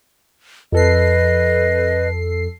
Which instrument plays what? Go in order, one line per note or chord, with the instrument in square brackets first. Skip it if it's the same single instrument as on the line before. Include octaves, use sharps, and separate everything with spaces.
[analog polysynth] F2 A4 C7 [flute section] B4 D#5